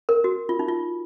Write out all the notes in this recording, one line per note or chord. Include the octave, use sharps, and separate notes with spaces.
A#4
F#4
F4
D#4
F4